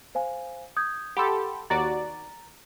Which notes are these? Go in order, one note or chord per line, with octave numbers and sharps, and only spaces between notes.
C5 F5 G#5
D#6 G6 G#6
G4 A4 F#5 B5 C6
D#2 F#4 D5 A#5 A6